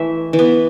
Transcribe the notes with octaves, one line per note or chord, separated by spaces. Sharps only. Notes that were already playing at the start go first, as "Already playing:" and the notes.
Already playing: E3 A3 E5
E3
B3